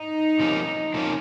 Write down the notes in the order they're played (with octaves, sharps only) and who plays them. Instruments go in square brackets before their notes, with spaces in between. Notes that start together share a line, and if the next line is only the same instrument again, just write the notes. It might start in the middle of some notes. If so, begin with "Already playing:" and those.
Already playing: [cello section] D#4
[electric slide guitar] C3 F3 A#3 C#4
C3 F3 A#3 C#4